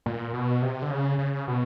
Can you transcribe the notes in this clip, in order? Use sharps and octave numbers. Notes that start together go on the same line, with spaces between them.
A#2
B2
C3
D3
C#3
C#3
B2